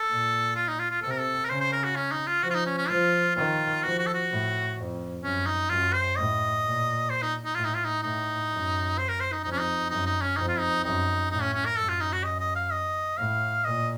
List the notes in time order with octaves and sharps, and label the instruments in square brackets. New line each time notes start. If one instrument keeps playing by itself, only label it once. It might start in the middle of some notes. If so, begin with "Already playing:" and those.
Already playing: [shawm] A4
[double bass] A#2
[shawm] F4
D#4
F4
F4
[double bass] C3 [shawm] A4
[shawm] A#4
A4
A#4
[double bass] C#3 [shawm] C5
[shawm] C5
A#4
F#4
C#4
D#4
F4
[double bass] F3 [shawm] F#4
[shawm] F4
D#4
C#4
C#4
[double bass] F3 [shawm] F4
[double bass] D#3 [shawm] F4
[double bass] F3 [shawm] F#4
[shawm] F#4
A4
F#4
[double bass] A2
F2
[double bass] F#2 [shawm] C#4
[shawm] D#4
[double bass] F#2 [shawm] F4
[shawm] C5
[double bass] A2 [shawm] D#5
[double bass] A#2
[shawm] C5
D#4
D#4
[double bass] A2 [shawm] F4
[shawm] D#4
F4
D#4
[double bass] A2 [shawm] D#4
[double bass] F#2
[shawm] C5
A#4
C5
D#4
[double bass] F2 [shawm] D#4
[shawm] C#4
D#4
[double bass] F#2 [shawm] D#4
[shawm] D#4
C#4
[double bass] F2 [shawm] D#4
[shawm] F4
D#4
[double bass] F#2 [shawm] D#4
[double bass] A2 [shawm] D#4
[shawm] C#4
C#4
A#4
[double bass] F#2 [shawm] A4
[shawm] F4
D#4
F#4
D#5
D#5
F5
D#5
[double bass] A2 [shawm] F5
[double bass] A#2 [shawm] D#5